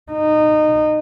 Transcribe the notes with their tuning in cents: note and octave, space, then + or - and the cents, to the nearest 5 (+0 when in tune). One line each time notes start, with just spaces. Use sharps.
D#4 -20